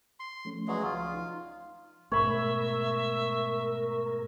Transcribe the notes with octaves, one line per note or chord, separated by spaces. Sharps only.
C6
F3 A3 C#4
F#3 G#3 B4 D5 E5
C2 F3 F4
D#4
G#2 B2 A3 A#4 C#5 E5 B5